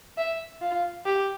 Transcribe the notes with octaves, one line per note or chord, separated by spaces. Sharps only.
E5
F4
G4